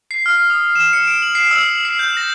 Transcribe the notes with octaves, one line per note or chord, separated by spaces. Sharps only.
C7
F6
D#6
E7
C#7
D7
F#7
C7
E6
C7
G6
A#6